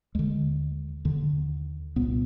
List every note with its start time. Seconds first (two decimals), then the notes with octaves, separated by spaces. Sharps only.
0.15 D#2 D3 G#3
1.05 D#2 D3
1.96 C2 A#2 B3